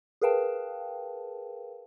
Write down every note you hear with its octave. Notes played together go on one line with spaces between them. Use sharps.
G#4 A#4 B4 F5 G5 A5